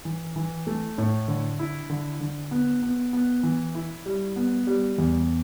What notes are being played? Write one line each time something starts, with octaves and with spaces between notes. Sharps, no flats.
E3
E3
A3
A2
D3
E4
D3
D3
B3
B3
B3
E3
E4
G3
B3
G3
E2